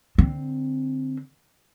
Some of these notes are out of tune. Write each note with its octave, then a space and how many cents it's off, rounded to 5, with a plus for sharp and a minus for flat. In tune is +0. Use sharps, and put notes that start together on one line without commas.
D3 +0 C4 +0